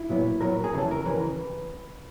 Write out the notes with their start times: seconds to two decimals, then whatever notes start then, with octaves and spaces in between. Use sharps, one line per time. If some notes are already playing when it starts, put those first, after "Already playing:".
Already playing: E4
0.09 A#2 F#3 B3
0.41 A#2 F#3 B3 A#4
0.64 G#4
0.73 E2 C#3 E3 G3 A4
0.91 A#4
1.05 C#3 E3 G3 B4